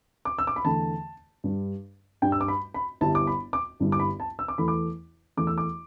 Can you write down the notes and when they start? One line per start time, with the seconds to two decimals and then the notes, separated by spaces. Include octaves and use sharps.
0.25 D6
0.39 E6
0.47 D6
0.56 B5
0.64 E2 D3 A3 A5
1.44 G2 G3 D4
2.22 G2 G3 D4 G5
2.32 E6
2.41 D6
2.48 B5
2.74 B5
3.01 G1 G2 G3 E4 A5
3.15 D6
3.27 B5
3.53 D6
3.80 G1 G2 G3 E4
3.92 D6
4.00 B5
4.20 A5
4.39 E6
4.48 D6
4.58 E2 E3 A3 E4 B5
4.68 D6
5.37 E2 E3 A3 E4 D6
5.47 E6
5.58 D6